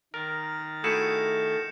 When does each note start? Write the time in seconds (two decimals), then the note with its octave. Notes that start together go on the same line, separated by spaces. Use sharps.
0.14 D#3 A#4 A#5 A6
0.84 A3 E4 F#4 G#4 G6 C#7 E7